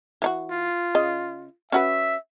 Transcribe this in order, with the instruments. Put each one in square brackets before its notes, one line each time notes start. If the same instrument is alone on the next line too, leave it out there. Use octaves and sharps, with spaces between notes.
[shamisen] E3 D#4 F#4
[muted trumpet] F4
[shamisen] C#3 D#5
[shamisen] C#4 F#4 B4 [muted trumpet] E5